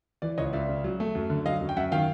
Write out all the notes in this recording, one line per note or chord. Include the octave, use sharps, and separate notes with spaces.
E3 D5
C#2 C#5 D#5
C#2 D5 E5
C#3
F#3
A3
F#2
D3
F#3 D#5 F5
F#2
G5
F#2 E5 F#5
D#3 F5 G5